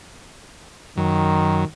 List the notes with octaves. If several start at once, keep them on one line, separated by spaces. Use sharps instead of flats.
F#2 D#3 F#3